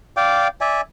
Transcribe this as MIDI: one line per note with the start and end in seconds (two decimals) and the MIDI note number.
0.17 0.48 74
0.17 0.48 77
0.17 0.48 79
0.17 0.48 86
0.61 0.81 74
0.61 0.81 76
0.61 0.81 80